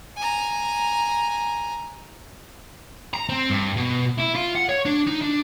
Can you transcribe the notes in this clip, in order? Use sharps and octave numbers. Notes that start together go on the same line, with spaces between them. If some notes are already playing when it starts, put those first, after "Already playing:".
G#5 A#5
A#5
C4
G2
B2
E4
F4
F#5
C#5
D4
D#4
D4